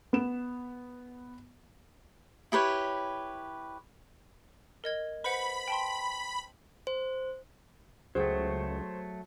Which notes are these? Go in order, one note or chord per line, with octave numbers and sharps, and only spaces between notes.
B3 E7
E4 G4 B4 C#5
A#4 D#5 G#6
B4 C5 F#5 B5
G5 A5 C6
C5
C#2 F#3 A3 G#4 C5 G5